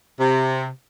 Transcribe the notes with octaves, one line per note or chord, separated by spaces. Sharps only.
C3